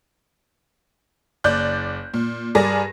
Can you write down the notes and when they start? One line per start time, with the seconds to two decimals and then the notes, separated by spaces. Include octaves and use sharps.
1.44 F#1 D5 F#6 G6
2.14 A#2
2.55 G2 G#4 A#4 D5 A#6